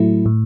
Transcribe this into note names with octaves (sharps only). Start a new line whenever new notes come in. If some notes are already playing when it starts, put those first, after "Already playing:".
Already playing: A2 F#3 A3 E4
A2